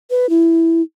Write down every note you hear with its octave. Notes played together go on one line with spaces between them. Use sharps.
B4
E4